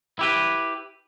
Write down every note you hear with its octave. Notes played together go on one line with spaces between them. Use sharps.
E4 G4 B4